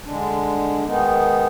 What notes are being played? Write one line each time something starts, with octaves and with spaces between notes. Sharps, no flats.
D3 G#3 D4
D#3 G#3 B3 D#4